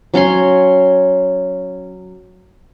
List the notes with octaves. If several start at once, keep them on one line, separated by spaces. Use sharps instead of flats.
F#3 C#4 C#5 C6